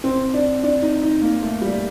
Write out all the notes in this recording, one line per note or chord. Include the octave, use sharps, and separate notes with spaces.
C4
D4
D4
D#4
D#4
A#3
A3
G3